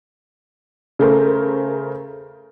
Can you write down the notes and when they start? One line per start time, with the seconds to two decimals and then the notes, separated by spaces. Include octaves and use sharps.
0.99 C#3 A3 A#4 C5